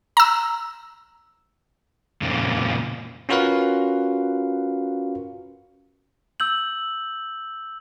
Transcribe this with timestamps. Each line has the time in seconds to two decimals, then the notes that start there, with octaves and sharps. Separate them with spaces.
0.17 A#5 E6
2.22 F2 A#2 C#3
3.29 C#4 F4 F#4 A#4 B4 F5
6.40 E6 G6 F#7